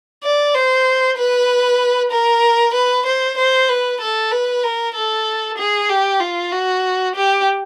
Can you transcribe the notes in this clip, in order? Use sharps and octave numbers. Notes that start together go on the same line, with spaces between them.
D5
C5
B4
A#4
B4
C5
C5
B4
A4
B4
A#4
A4
G#4
G4
F4
F#4
G4